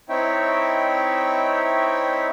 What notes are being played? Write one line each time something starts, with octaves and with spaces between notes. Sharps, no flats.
C4 D#4 E4 C#5 E5 G5